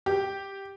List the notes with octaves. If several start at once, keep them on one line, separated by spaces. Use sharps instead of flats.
G4